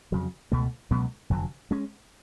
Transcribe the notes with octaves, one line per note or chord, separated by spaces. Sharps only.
F2 C#3 F#3
C#2 B2 A3
C#2 B2 F#3 B3
F1 F2 D3 F#3
G#3 C#4